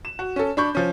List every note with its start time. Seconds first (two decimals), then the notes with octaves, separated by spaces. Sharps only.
0.05 E7
0.19 F#4
0.36 C#4 A4
0.57 D4 B5 C#6 G6
0.75 F3 C#4